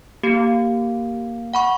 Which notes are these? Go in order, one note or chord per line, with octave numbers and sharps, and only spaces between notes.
A#3 G4
F#5 B5 C#6